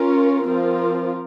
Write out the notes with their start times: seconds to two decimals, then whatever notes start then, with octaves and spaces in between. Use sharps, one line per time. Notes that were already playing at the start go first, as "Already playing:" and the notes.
Already playing: C#4 F4 A#4
0.44 F3 C4 F4 A#4